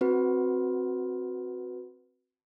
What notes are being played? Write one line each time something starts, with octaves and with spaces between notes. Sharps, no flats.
C4 F#4 B4